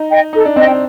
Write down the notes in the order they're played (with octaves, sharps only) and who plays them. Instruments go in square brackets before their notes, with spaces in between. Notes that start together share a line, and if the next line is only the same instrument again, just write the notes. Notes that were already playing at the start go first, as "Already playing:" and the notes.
Already playing: [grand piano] D#4
[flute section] D#5 G5
[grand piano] D#4 [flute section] A4
[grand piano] D4
[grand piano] C4 [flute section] D#5 G5
[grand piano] D4